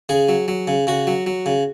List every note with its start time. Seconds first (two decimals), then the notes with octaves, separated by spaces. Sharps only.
0.09 C#3 G#4
0.29 F#3
0.48 F#3
0.68 C#3
0.87 C#3 F#4
1.07 F#3
1.26 F#3
1.46 C#3